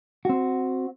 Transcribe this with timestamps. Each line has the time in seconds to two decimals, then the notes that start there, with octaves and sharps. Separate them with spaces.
0.25 C4 F#4